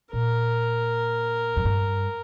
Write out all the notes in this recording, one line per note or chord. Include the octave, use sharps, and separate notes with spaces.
A#2 A#4
F2
G2